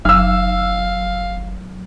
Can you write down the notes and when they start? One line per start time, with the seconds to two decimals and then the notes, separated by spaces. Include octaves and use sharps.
0.05 F#1 F#3 F5 E6 F6